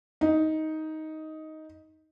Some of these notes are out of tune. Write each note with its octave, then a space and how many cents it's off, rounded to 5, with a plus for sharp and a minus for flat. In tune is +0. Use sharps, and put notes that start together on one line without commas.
D#4 +10